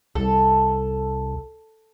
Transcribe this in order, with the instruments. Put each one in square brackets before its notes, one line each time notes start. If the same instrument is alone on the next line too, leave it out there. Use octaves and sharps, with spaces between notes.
[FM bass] C2 [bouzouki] A4